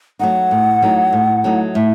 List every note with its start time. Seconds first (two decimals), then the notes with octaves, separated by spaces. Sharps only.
0.19 F#3 A3 D#4 F#5
0.51 A2
0.82 F#3 A3 D#4
1.13 A2
1.44 F#3 A3 D#4
1.74 A2 E5